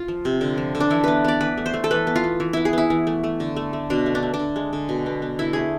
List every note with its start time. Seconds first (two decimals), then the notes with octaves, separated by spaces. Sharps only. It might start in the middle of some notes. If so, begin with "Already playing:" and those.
Already playing: F4
0.08 F3
0.25 C3
0.41 D3
0.58 F3
0.75 D3
0.80 D4
0.90 E3 E4
1.04 B3 B4
1.24 B3 D5
1.40 E3 B4
1.57 A3
1.66 C5
1.74 A3
1.84 A4
1.91 E3 B4
2.07 B3
2.16 F4
2.24 B3
2.40 E3
2.53 B3 E4
2.65 G#4
2.73 B3 E4
2.90 E3
3.07 A3
3.24 A3
3.40 D3
3.56 A3
3.73 A3
3.90 B2 D4
4.06 A3
4.15 D4
4.23 A3
4.34 D4
4.39 D3
4.56 G#3
4.73 D3
4.89 B2
5.06 B3
5.22 B3
5.39 D3 E4
5.53 A3 G#4